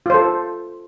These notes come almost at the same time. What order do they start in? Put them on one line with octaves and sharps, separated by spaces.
F4 C5 A4